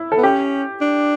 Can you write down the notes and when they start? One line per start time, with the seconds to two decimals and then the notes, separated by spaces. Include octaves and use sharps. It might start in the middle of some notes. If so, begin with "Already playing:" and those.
Already playing: E4
0.12 A4
0.17 B3
0.23 C#4 G4
0.81 D4